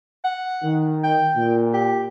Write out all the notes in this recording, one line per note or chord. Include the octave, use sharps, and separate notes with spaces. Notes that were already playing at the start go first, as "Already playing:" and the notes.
F#5
D#3
G5
A#2
G4